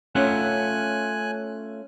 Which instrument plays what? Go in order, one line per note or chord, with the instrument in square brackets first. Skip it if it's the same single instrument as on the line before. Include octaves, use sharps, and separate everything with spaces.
[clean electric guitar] A3 F4 F#5 [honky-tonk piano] C#4 [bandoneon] G#5 F#6